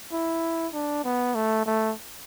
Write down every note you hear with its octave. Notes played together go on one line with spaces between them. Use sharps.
E4
D4
B3
A3
A3